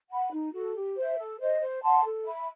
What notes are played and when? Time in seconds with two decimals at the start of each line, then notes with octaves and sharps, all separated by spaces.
0.10 F#5 B5
0.32 D#4
0.53 F#4 A4
0.75 G4
0.96 C5 E5
1.18 A4
1.40 C5 D#5
1.61 C5
1.83 F#5 A5 C6
2.04 A4
2.26 E5 B5